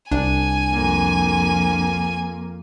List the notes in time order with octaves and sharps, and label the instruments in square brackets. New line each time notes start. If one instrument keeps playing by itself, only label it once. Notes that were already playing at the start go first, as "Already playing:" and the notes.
[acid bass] C2 [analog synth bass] D4 [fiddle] G#5
[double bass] F2 A#3